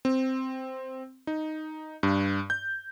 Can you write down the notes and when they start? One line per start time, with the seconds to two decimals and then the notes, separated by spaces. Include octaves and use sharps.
0.05 C4
1.27 D#4
2.03 G2
2.50 G6